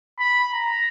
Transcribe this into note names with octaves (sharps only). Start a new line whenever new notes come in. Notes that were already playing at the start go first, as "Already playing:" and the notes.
B5
A#5